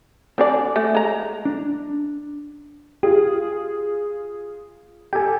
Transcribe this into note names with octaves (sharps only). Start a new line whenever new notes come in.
C4 D4 A4 D5 F#5 G#5
A3
G#3 A#5
D4
F4 G4 G#4
G4 A4 G5 G#5